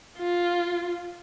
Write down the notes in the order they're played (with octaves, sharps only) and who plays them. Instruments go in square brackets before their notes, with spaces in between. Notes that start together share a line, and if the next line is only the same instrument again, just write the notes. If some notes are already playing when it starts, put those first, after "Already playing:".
[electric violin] F4